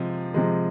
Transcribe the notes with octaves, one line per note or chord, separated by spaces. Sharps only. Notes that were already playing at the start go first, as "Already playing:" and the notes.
Already playing: C3 F3 G#3
C3 F3 G#3